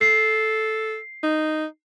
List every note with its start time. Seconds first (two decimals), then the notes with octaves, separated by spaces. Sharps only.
0.01 A4 C7
1.23 D#4